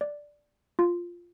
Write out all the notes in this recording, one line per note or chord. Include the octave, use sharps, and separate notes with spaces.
D5
F4